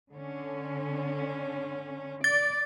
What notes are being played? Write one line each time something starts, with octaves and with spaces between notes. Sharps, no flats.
D3 C#4
D5 A6